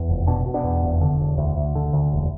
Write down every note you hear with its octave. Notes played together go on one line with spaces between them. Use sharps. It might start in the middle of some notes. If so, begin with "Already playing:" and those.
Already playing: E2
F1
B2 D4
B2
B3 D4
E2
F1
D3
E1
D2
D2
D3
D2
E1